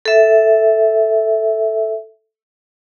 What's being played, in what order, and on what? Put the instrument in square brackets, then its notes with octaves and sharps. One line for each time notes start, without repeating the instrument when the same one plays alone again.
[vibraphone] A4 E5